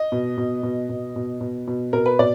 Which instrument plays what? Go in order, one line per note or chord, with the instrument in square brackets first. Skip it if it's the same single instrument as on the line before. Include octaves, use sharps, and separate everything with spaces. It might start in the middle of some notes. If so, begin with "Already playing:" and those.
Already playing: [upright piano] D#5
B2
B2
B2
B2
B2
B2
B2
B2 A#4
B4
B2 D5